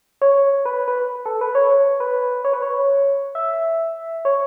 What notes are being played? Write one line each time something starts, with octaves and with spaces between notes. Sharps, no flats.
C#5
B4
B4
A4
B4
C#5
B4
C#5
B4
C#5
E5
C#5